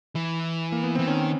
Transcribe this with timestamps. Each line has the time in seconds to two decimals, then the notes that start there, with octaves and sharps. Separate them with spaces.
0.15 E3 E4
0.72 A#3
0.83 B3
0.95 E3 C4
1.07 D#3 C#4